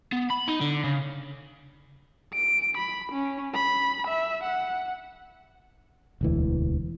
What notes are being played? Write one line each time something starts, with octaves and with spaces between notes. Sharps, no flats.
B3
B5
D#4
D3
C#3
D7
B5
C#4
B5
E5
F#5
E1 D2 E3